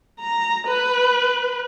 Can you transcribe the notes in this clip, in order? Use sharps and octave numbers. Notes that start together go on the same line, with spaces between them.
A#5
B4